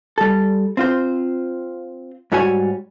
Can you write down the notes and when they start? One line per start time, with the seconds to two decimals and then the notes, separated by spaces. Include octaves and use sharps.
0.18 G3 A4
0.77 C4 F4 C5
2.32 G#2 G3 F#4 C#5 G#5